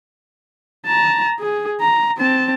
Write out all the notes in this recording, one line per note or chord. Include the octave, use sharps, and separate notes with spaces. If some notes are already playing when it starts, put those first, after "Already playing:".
A5 A#5
G#4
A#5
C4 A5